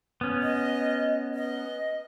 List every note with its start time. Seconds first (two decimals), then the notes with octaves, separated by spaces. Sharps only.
0.21 B3 C#4
0.42 D#5
1.35 D#5